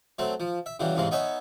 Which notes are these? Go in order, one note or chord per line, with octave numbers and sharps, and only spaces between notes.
F#3 A3 C4
F3
E5
C#3 E3 F#3 G3
A1 E2 G#2 C3 G#3 F5
B3 D#4 C#5 E5 G#5